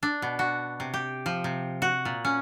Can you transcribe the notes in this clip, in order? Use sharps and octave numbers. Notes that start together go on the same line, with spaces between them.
D4
B2
F#4
C3
G4
F3
C3
F#4
A#2
C#4